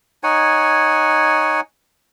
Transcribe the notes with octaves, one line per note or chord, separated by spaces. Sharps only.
D#4 C#5 F#5 G#5